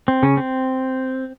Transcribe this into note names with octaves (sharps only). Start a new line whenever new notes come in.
C4
C#3 C#4
C4